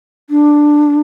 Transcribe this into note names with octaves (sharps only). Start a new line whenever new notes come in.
D4